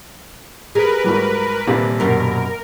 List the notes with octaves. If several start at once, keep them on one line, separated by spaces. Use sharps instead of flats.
G#4 A#4 B4
G#2 F#3 G3
D#1 C3 G3 A#3
F#2 B2 A#4